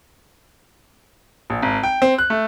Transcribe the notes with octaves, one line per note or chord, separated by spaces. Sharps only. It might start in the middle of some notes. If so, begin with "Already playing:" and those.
A#1
G#1
G5
C4
F#6
A3